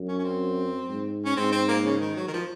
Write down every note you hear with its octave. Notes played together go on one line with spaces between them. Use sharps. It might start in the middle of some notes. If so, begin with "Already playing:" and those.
Already playing: F#2
C#4
C#4
C4
G#2
C#4
G#2 C4
C4
A#3
C#3
D#3
F#3
D#3
F3